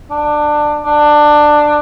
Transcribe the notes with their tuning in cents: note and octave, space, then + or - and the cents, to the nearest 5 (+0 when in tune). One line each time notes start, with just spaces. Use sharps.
D4 +20
D4 +15